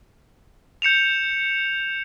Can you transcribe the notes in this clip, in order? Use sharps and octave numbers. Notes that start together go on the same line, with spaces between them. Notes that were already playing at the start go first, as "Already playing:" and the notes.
G6 C#7 E7 F7